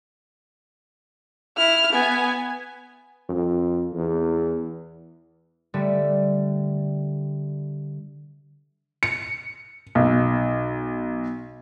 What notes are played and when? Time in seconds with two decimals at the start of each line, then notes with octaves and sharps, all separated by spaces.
1.57 E4 F6
1.93 B3 G#5
3.29 F2
3.93 E2
5.74 D3 G3 A3
9.03 C#7
9.95 B1